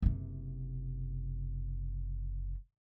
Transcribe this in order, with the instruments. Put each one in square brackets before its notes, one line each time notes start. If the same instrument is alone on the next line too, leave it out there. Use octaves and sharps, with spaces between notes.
[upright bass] F#1 C3